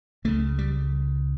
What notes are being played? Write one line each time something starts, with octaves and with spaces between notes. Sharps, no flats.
C#2 C#3 A3
G3